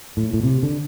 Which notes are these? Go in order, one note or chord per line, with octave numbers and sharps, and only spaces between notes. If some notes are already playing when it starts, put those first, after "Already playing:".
A2
A2
C3
D3